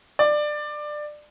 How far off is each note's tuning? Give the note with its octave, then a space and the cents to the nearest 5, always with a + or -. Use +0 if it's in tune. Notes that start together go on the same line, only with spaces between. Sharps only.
D5 +20